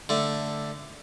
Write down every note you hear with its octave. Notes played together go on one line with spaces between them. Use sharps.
D3 A3